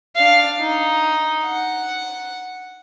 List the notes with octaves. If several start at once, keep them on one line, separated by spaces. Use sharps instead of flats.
D4 F5
D#4
F#5